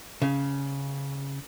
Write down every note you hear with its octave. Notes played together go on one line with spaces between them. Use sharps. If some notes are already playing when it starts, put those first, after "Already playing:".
C#3